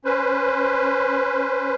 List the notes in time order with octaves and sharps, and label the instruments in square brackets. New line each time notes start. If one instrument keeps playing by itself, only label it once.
[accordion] C#4 B4 C5